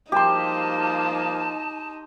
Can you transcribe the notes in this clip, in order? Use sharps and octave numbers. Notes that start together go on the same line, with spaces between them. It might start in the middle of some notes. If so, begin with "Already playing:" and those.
F3 G3 A#3 D#4 G4 A5 C6